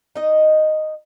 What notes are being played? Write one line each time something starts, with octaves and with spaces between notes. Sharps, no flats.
D#4 D#5